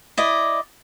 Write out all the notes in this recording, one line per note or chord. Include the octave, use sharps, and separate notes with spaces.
E4 D5 D#5